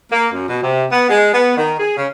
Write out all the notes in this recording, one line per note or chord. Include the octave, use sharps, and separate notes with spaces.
A#3
F#2
B2
C3
B3
G#3
B3
D#3
G#4
C#3